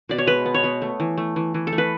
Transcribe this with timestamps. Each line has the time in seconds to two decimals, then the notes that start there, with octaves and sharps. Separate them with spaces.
0.09 B2 D5
0.18 C#5
0.27 G#3 B4
0.45 B3
0.54 C#5
0.64 B3
0.82 A3
1.00 E3
1.17 A3
1.36 E3
1.54 E3
1.67 A4
1.72 A3
1.78 B4